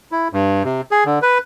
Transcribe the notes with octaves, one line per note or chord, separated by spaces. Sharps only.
E4
G2
C3
G#4
D3
B4